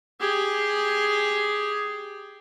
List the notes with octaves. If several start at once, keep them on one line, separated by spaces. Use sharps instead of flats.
G4 G#4